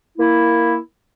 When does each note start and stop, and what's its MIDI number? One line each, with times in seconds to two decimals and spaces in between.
0.18 0.77 58
0.18 0.77 64